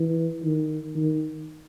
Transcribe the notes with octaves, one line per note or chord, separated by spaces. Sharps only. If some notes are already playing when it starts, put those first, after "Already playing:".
Already playing: E3
D#3
D#3